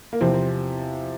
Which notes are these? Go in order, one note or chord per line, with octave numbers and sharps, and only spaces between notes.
A#3
E2 C3 F3 C4
C4